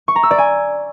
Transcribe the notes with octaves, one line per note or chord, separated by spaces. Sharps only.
C#6
A#5
E6
D5
G#5